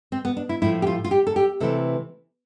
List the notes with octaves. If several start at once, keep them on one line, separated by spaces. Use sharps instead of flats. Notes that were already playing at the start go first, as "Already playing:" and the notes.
C4
B3
D4
E4
A2 F3 A3 E4
G4
F4
F4
G4
A4
G4
C3 E3 A3 A4